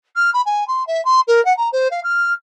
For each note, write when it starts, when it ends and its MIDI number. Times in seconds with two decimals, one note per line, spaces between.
0.16 0.30 89
0.33 0.41 83
0.46 0.66 80
0.67 0.86 84
0.87 1.03 76
1.05 1.21 84
1.27 1.43 70
1.45 1.55 78
1.57 1.69 82
1.72 1.88 72
1.91 2.00 77
2.03 2.33 89